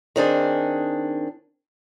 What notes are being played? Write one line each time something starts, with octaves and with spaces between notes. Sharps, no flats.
D#3 C4 D4 G#4